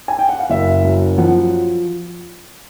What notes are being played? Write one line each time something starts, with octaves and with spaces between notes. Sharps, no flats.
G#5
G5
F#5
F5
F#1 E5
F#2
F3 F#5